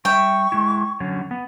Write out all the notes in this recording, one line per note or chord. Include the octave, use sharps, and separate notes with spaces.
G3 E5 G5 C#6
G#3 E4
D3 F#3 C#4
B3